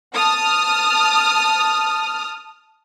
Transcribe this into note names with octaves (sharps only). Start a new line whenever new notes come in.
A5 D#6 F6